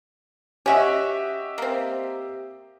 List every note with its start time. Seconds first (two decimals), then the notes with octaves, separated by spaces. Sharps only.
0.66 C#4 F#4 G4 D#5 E5
1.58 A#3 C4